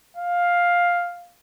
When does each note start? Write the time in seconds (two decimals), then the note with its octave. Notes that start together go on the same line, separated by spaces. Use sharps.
0.17 F5